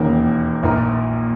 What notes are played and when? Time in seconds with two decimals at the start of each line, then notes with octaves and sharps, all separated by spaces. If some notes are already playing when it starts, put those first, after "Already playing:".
Already playing: E1 D#2 D#3 A#3 C#4
0.63 A#1 A#2 A#3 D#4 A#4